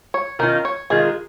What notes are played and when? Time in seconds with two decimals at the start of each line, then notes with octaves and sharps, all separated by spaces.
0.14 C#5
0.39 D#3 C#4 F4 A#4
0.65 C#5
0.90 D#3 G#3 F4 G#4